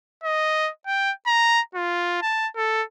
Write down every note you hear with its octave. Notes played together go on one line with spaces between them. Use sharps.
D#5
G5
A#5
F4
A5
A4